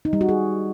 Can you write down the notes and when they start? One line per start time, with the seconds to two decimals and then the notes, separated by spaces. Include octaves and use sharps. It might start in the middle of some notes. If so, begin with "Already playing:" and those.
0.05 D#4
0.13 G3
0.21 F#4
0.29 G#4